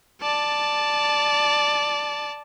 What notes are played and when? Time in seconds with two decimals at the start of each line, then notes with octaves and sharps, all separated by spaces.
0.22 D5 A5